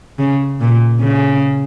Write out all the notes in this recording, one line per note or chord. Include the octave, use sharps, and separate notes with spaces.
C#3
A#2
C#3